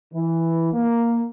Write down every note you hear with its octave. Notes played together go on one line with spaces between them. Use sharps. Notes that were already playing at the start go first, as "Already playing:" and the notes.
E3
A#3